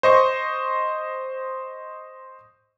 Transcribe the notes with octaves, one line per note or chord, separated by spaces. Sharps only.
C5 D#5 C#6